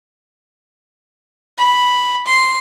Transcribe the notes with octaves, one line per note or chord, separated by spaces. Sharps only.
B5
C6